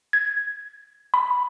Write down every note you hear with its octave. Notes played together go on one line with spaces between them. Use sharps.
G#6
B5